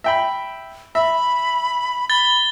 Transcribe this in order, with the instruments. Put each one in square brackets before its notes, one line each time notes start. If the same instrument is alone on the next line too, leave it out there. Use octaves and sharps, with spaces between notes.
[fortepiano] E5 G5 B5
[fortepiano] E5 [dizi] B5
[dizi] B5 [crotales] A6 G7